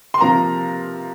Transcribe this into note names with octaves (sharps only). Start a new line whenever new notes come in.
C6
C3 F3 A#3 A#5